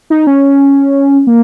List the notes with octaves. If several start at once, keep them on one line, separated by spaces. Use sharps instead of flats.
D#4
C#4
A#3